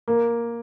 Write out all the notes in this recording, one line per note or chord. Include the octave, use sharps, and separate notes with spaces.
A#3